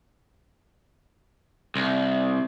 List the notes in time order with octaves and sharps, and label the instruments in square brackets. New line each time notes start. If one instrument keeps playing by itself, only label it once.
[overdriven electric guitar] C2